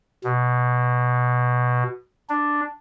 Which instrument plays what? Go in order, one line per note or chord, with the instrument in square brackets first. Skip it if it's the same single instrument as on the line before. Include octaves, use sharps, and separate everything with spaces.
[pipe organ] B2
D4